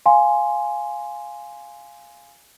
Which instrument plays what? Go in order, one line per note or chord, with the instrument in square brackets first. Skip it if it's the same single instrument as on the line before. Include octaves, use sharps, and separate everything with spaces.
[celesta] F5 G#5 C6